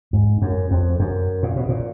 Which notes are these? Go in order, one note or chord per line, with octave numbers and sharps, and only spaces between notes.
G#2
F#2
F2
F#2
A#2
B2
A#2